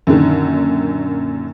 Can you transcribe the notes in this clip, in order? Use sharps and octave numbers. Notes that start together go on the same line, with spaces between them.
F#2 A#2 D3 D#3